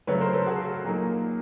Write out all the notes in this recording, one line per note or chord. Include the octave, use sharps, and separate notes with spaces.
C#3 F#3 A3 B4 C#5
A#4 C5
A4 B4
F#4 G#4
A#2 F#3 A#3 D#4